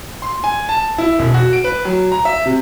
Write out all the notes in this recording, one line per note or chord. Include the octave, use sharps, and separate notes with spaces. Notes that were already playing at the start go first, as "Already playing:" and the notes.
C6
G#5
A5
E4
E1
F#4
D7
B4
F#3
A#5
E5
C3